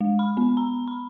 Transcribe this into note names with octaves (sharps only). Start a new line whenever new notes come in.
G#3
B5
B3
A#5
B5